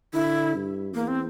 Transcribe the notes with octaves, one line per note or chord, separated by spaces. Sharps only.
D3 E4
G2
E2 A#3
C4